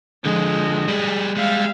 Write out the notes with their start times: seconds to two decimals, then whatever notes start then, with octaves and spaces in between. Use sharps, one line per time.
0.25 D3 F3 G#3
0.88 G3 G#4
1.37 G3 G#3 E5 F5